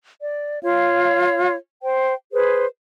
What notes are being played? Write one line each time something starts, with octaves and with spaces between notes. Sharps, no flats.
D5
F4 C#5 F5
C5 G5
G#4 B4 C5